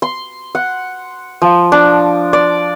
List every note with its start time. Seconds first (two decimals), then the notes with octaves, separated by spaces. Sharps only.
0.02 C6
0.55 F#5
1.42 F3
1.72 D4
2.33 D5